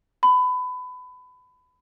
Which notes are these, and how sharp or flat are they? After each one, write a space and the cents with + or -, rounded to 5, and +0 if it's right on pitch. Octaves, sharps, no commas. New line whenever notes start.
B5 +25